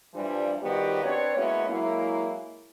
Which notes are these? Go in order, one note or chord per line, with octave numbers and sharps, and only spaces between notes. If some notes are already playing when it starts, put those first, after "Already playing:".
G2 E3 F3 G3 D4
D#3 F3 G3 B3 F#4 G4
C4 D4 B4 C#5
G#3 A#3 B3 C#4 E4 F#4
F#3 G#3 A#3 E4